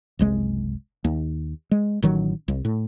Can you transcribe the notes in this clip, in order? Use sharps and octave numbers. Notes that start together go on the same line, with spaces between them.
F#1 C2 G#3
D#2
G#3
A1 D#3 F#3
C2
A2